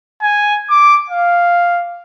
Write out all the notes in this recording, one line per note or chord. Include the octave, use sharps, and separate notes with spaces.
G#5
D6
F5